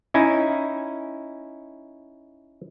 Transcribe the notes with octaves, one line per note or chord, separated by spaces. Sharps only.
C#4 D#4 E4 G#5